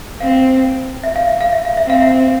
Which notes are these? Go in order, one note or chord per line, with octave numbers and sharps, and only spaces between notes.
C4 F5
E5
F5
E5
F5
E5
F5
E5
C4 F5
E5